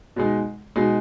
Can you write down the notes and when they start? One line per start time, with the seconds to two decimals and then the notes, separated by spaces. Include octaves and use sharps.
0.16 B2 G#3 D#4
0.76 B2 G#3 D#4